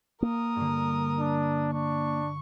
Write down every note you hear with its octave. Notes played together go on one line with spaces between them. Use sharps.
A#3 A#4 D#6
G2 D3
D4
D4 C#6